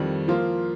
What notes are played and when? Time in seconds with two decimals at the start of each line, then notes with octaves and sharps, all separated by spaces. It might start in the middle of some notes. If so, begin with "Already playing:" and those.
Already playing: F2 D#3 G3
0.28 F3 A#3 F4